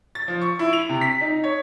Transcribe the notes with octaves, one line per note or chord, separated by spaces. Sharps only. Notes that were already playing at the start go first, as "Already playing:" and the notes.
A6
F3
C#6
E4
F7
C3
B6
D#4
C#5